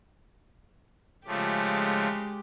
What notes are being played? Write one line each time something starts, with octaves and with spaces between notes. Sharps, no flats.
C#3 F3 G#3 A3 G4